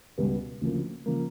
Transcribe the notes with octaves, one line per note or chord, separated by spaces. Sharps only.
C#2 B2 G3 B3
D2 C#3 F3 A#3
C#3 F3 A#3